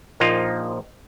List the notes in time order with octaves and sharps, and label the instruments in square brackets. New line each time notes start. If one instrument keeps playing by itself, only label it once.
[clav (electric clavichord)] A#1 A#2 F3 A#3 D#4 F4